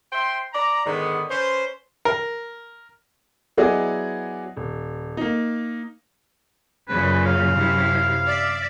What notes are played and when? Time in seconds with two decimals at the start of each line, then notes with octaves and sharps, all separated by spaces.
0.12 C5 E5 G5 C6
0.53 D5 A#5
0.86 G#2 D3 D#3 B3
1.29 C#4 B4 C5
2.05 A#4
3.57 F#3 B3 E4 G#4 D5 D#5
4.56 D#1
5.17 A#3 D#4
6.89 F#2 A#2 C#3 B4
7.26 F5
7.56 F#2 C3 E4
8.27 D5 E5